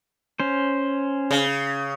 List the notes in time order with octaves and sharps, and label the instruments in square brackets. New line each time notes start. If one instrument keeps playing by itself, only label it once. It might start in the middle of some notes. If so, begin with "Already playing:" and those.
[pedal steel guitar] C#4 C5
[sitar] C#3